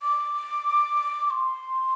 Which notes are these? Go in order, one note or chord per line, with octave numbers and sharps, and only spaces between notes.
D6
D6
C6